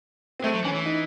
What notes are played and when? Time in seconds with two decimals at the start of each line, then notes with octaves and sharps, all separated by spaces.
0.40 C4
0.44 G#3 A3
0.54 F#3
0.64 E3 C#4
0.75 E3
0.86 D#4